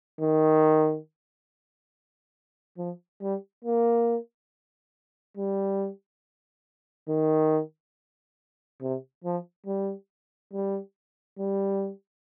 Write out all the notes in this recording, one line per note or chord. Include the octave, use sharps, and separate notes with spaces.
D#3
F3
G3
A#3
G3
D#3
C3
F3
G3
G3
G3